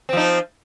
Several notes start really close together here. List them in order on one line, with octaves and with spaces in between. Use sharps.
C4 F3 D#4